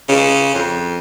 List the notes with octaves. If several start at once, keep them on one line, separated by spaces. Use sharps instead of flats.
C#3
F2